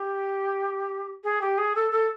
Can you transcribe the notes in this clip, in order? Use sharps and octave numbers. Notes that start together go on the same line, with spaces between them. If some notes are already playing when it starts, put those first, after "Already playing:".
Already playing: G4
G#4
G4
G#4
A4
A4